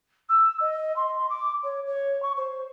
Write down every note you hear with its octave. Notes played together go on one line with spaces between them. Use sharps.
E6
D#5
C6
D6
C#5
C#5
C#6
C5